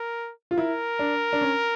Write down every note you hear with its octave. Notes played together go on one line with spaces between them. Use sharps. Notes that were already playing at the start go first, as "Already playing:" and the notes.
Already playing: A#4
F4
E4 A#4
D4
D4
C#4